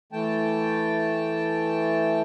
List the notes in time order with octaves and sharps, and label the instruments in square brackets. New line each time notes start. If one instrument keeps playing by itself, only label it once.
[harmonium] E3 A3 G5 A5